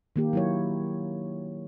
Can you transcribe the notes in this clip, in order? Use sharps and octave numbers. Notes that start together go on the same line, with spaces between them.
D#3 A#3 G4
F#3 E4 C#5